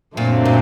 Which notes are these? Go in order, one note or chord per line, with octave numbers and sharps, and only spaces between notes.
F#2 A#2 D3 F#3 A3 C4
A#2